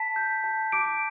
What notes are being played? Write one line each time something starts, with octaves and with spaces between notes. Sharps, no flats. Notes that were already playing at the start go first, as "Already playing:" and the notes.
Already playing: A5 B6
G6
A5
D6 D7